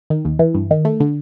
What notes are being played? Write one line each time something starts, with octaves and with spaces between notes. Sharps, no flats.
D#3
D#2
E3
G2
D#3
A3
D3